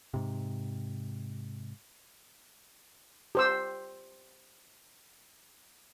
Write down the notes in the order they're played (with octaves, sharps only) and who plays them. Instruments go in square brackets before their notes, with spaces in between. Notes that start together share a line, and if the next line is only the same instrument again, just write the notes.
[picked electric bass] G#2 C3
[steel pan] G4 C5 E6